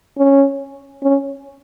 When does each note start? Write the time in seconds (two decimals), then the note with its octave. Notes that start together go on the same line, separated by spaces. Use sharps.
0.18 C#4
1.03 C#4